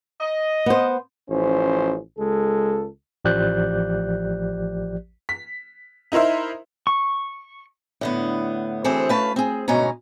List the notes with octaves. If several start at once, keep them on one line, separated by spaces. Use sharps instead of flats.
D#5
B3 C5
A1 F3 C#4 C5
C#2 G#3 A4
A1 F3 G4 D5 F#6 G6
B6
D#4 E4 A#4 C5 E5
C#6
A2 D3 B3
D2 E3 C4 G#4 A4 C5
A3 C#4 B4 F5 A5
C4 G#4
D2 G#2 B2 C#4 G#5 A#5